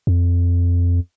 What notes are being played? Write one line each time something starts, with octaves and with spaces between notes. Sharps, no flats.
F2